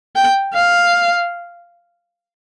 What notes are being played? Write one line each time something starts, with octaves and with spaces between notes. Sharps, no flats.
G5
F5